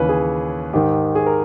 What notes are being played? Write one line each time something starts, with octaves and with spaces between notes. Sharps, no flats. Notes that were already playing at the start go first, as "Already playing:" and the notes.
Already playing: D#2 C#3 E3 B4 C#5
G#4
G#2 D#3 G4
G#4
A#4